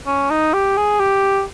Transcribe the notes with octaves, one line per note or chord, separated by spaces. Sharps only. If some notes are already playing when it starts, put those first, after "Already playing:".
C#4
D#4
G4
G#4
G4